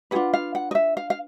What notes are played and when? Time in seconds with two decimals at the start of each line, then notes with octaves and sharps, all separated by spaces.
0.11 D4 F4 G#4 B4 F#5
0.33 F5
0.55 F#5
0.71 D#5
0.75 E5
0.97 F5
1.10 F5